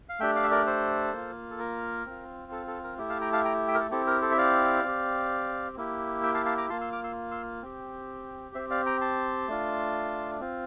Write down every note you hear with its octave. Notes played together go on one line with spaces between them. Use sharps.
F5
A3 D4 G4 E5 G5
D5 F5
E5
A#4 D5
A4 C5
A#3 F4
A4
A#4
C4 F4
A4
A4
A#4
A3 E4 G4
F5 A5
G5 A#5
F5 A5
G5 A#5
E5 G5
A#4
A4
C4 E4 G4 A4
A#4
A4 C5
E5
D5 F5
C4 G4
A#3 E4 G4
E5 G5
F5 A5
F5 A5
A#5 D6
A#3 F4 A5 C6
C6 E6
D6 F6
C6 E6
C6 E6
C4 G4
C4 G4 C5 E5
D5 F5
G5 A#5
A5 C6
A3 D4 F4
C4 F4